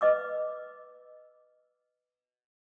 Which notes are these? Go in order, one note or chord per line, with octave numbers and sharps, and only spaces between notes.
B4 D#5 D6 E6